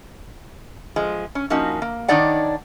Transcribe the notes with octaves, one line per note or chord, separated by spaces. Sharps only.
F3 G#3
C#4
F3 A#3 C#4 D#4 F#4
A#3
D#3 D4 D#4 C#5 D5 F#5